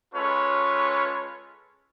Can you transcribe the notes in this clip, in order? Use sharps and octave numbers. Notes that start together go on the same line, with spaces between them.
G#3 C#4 F4 A4 B4 C#5